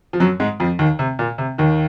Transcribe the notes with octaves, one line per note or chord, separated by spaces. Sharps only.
F3
F#2 F#3
G#2 G#3
F2 F3
D#2 D#3
C3
A#2
C3
D#2 D#3